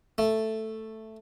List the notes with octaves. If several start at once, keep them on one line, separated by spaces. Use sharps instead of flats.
A3